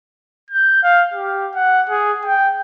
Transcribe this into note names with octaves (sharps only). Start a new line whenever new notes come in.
G6
F5
G4
F#5
G#4
G5